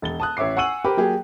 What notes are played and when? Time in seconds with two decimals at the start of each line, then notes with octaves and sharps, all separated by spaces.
0.02 E1 A6 G7
0.20 A5 D#6 F#6
0.37 A1 C#5 E5 D6 C7
0.57 F#5 G#5 C#6 E6 D#7 F#7
0.85 G4 A#4 C5 B5 D6
0.97 F#3 A#3 G4 G#4